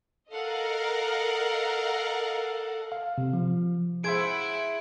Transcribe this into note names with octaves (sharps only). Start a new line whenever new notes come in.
A4 A#4 D#5 F5 F#5
F5
C3
F3
E4 G#4 C5 E5 F#5 G#6 D7